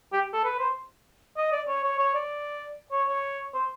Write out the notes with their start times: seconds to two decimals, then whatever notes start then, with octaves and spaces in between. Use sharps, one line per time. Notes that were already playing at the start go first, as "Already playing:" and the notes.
0.13 G4
0.33 A4
0.44 B4
0.59 C5
1.37 D#5
1.52 D5
1.68 C#5
1.84 C#5
1.99 C#5
2.15 D5
2.92 C#5
3.08 C#5
3.54 C5